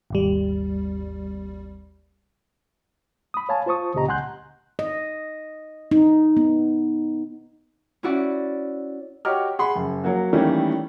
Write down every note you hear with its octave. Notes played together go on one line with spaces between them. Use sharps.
G#1 D#2 G3
B5 D#6
C#5 F5 G#5 A5
F4 C5 A5 C#6 D#6
C#2 A#2 C#3 G4 D#5 A#5
C#2 F#5 G#5 C6 F#6 G6
D#5
D#4
B3
C#4 E4 F#4 D5
F#4 G4 C#5 D#5 D6 F6
G#4 F#5 B5 C6
F#1
F#3 A#3 F#4
D#3 E3 G3 A3 A#3 C#4